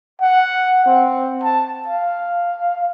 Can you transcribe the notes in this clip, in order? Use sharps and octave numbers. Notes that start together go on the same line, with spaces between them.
F#5
C4
A5
F5